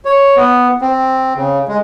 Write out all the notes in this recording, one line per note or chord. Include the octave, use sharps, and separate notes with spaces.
C#5
B3
C4
C#3
G#3